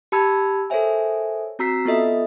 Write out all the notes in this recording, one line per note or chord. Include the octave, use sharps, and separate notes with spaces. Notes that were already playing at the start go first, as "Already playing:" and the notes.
G4 A5 B5 E6 G#6
A4 A#4 C5 C#5 E5 G#5
C4 F#4 A#5 E6 B6 C7
B3 F4 A4 D#5 E5